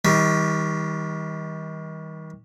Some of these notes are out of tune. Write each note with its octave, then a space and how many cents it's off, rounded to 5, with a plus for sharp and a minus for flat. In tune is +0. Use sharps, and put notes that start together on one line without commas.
D#3 +35 G3 +0